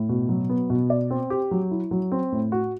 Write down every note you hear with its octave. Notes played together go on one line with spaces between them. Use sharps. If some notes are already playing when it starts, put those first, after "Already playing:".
Already playing: A2
B2
F#3
B3
B2
D5
C4
G4
F#3
E4
F#3
C4
A2
F#4